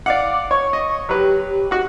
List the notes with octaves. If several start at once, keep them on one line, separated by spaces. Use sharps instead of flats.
D5 F5 F#5 D6
C#5 C#6
D#5
F#3 G4 B4
F#4 F#5